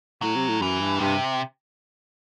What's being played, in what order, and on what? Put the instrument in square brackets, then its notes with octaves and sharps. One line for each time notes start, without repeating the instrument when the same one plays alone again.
[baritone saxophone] A2 [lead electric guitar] F#3
[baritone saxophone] C3
A2
[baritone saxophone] F#2 [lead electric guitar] E3
[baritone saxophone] G2
[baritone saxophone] G2 [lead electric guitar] C3